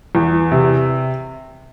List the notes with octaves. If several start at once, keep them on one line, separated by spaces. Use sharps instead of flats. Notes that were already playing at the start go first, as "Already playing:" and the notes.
E2
C3